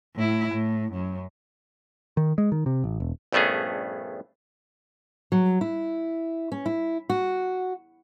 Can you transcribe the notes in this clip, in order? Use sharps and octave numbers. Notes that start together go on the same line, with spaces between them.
A2 E4
A2
F#2
D#3
G#3
D#3
C3
A1
E1
A#1 G2 A3 B3 C#4 G#4
F#3
E4
C#4
E4
F#4